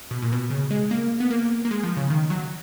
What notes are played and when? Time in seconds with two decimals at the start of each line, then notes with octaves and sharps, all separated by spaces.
0.11 B2
0.22 A#2
0.32 B2
0.50 C#3
0.71 G#3
0.91 A#3
1.20 B3
1.31 A#3
1.65 A#3
1.71 G#3
1.83 F3
1.97 C#3
2.10 D#3
2.30 F#3